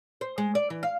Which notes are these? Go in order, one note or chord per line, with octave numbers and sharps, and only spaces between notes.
C5
G#3
D5
E3
F5